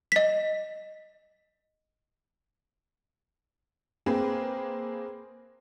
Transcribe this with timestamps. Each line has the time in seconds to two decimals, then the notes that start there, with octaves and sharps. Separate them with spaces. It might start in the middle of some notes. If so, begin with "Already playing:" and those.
0.12 D#5 B6
4.06 A#3 C4 G#4 B4